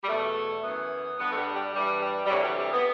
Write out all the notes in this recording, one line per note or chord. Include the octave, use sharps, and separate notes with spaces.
G3
E2 B2 A3
F#2 E3 B3
G2 D3 B3
A3
G3
G3
G2 E3 G3
G3
G3
D2 C3 E3 F#3
G3
G3
B3